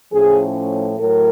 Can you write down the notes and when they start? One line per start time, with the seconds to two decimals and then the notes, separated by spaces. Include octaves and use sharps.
0.13 A2 F3 A3 C#4 G#4
0.98 A2 F#3 A#4